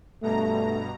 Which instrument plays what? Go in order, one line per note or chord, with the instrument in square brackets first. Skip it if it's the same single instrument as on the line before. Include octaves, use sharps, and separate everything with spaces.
[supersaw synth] G2 B2 A#5 [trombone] A3